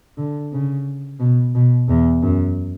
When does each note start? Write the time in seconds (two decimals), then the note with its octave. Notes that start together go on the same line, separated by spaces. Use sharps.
0.18 D3
0.53 C#3
1.20 B2
1.55 B2
1.89 E2
2.22 F#2